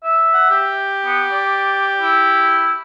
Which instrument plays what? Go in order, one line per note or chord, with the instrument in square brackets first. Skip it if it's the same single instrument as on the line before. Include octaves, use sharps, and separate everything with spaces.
[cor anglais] E5
[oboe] F#5
G4
[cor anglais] B3
D5
E4